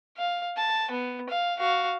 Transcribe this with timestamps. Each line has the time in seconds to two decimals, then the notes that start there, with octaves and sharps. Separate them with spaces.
0.17 F5
0.57 A5
0.91 B3
1.29 F5
1.59 F#4 F5